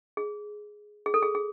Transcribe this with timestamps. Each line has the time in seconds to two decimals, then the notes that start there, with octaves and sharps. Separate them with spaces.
0.17 G#4
1.06 G#4
1.14 A4
1.23 G#4
1.35 G#4